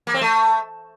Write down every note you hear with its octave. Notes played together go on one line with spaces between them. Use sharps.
A#3
C4
A3